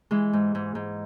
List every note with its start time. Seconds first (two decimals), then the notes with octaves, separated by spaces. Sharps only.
0.11 E3 G#3
0.33 G#2
0.55 G#2
0.75 G#2